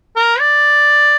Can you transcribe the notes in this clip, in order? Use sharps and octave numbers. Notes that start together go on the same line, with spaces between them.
A#4
D5